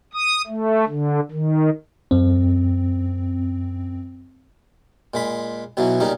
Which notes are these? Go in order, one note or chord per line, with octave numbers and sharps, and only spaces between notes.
D#6
A3
D3
D#3
F#2 C4
A#2 G#3 B5
B1 B2 E3 F#3
A#2 C#3 G3 D#4